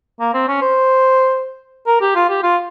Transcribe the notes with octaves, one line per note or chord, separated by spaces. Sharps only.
A#3
C4
C#4
C5
A#4
G4
F4
G4
F4